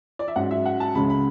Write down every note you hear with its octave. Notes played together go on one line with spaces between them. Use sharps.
D5
E5
G#2 F#3 C#4 F#5
E5
F#5
A5
C#2 C#3 G#3 C#4 B5
B5